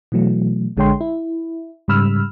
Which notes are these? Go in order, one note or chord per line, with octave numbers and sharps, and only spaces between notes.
B2 E3 F#3 A3
A#1 D3 G#3 C#5 G5 C6
E4
G#2 C#3 G3 B5 E6 F6